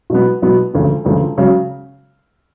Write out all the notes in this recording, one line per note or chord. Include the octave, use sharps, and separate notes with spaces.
B2 F#3 B3
B2 F#3 B3
E1 D2 C#3 F3
E1 D2 C#3 F3
C#3 F#3